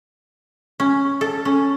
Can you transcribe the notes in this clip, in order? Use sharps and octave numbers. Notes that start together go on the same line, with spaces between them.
C#4
A4
C#4